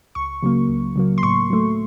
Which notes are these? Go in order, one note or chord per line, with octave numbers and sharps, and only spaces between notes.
C#2 C#6
C#3 F#3 A#3
C#2
C#3 F#3 A#3
C6
A2 C#6
F#3 A3